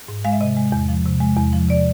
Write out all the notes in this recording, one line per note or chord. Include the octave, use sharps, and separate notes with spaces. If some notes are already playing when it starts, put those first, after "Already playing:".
G#2
G#3 F5
E5
C3 D#5
G#3
E2
F3
C3
G#3
E2
F3
C3 D5